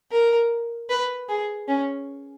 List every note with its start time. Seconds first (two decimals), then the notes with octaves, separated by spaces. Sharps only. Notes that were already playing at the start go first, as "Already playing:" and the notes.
0.11 A#4
0.90 B4
1.29 G#4
1.68 C#4